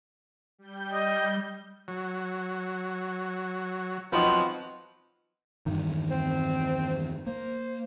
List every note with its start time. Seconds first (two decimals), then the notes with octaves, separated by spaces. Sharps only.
0.59 G3 G6
0.93 D#5
1.88 F#3
4.13 F3 F#3 B3 C4 D#4
5.66 E2 G2 D#3
6.11 C4
7.26 A#3 C5